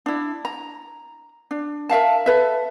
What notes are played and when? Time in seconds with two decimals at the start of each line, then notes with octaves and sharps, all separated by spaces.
0.06 D4 E4
0.45 A#5
1.51 D4
1.89 A#4 E5 F5 A5
2.26 A4 B4 E5